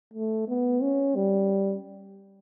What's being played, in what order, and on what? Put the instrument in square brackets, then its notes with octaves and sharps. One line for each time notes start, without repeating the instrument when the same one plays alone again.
[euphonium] A3
B3
C#4
G3